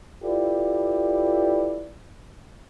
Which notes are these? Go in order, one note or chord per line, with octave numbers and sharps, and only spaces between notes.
E4 F4 G4 A4 B4 D5